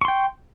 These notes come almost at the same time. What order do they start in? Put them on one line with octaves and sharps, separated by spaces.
C#6 C6 G5